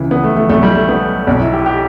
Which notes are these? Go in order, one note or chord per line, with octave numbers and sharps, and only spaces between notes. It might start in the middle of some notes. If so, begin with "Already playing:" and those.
Already playing: C#2 C#3 E3
B3
A3
A3
B1 B2 A3
G3
A3
B3
B1 B2
E4
G4
G4